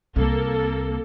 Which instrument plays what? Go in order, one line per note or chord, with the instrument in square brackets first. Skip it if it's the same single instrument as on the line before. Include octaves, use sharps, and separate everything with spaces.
[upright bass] C2 C4 [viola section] A#3 A4